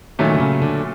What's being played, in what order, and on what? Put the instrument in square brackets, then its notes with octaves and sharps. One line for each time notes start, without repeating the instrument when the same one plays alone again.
[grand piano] A#2 F#3 A3 C#4 [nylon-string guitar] D#3
[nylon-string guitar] D3
C#3
D3